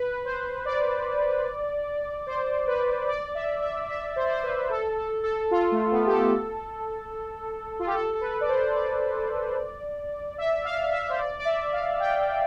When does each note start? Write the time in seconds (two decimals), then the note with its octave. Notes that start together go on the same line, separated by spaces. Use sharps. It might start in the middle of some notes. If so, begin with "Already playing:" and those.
Already playing: B4
0.25 C5
0.65 D5
2.27 C5
2.67 B4
3.08 D5
3.35 E5
3.62 E5
3.90 E5
4.16 C5
4.23 D5
4.32 C5
4.43 B4
4.70 A4
4.97 A4
5.24 A4
5.51 F4
5.72 A3
5.91 B3
6.06 G4
6.12 A4
7.79 F4
7.87 G4
7.94 A4
8.14 A4
8.21 B4
8.41 D5
8.49 C5
8.75 D5
10.38 E5
10.65 F5
10.92 E5
11.09 C5
11.19 D5
11.39 D5
11.45 E5
11.73 F5
12.00 G5